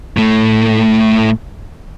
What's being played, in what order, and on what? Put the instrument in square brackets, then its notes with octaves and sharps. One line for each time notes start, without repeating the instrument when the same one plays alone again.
[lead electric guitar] A2 A3